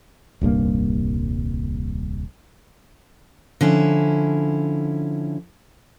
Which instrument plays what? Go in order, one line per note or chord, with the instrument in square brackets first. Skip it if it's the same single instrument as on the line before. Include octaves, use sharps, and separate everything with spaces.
[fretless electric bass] D#1 C2 G2 A#3
[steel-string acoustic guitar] D3 F3 C#4 E4